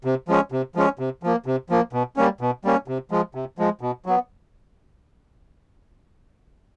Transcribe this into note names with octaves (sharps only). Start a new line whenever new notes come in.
C3
F3 G#3 C#4
C3
F3 G#3 C#4
C3
F3 A#3
C3
F3 A#3
B2
G3 A#3 C#4
B2
G3 A#3 C#4
C3
F3 G#3
C3
F3 G#3
B2
F#3 B3